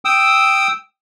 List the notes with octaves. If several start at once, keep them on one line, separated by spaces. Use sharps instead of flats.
G5 D#6 E6